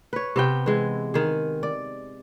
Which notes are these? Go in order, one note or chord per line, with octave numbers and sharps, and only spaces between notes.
B4 C#5
C3 B3 G5
E3 G#3
D#3 G#4
D5